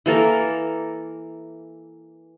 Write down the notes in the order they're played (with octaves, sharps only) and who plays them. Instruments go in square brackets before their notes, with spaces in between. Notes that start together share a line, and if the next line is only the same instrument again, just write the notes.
[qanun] E3 A#3 A4 A#4